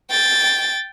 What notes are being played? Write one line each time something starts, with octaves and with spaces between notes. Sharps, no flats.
G5 A6